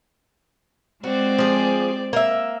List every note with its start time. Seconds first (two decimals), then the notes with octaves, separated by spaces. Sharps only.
1.04 G#3 C4 F#4 D5
1.38 F3 G#4
2.13 A#3 E5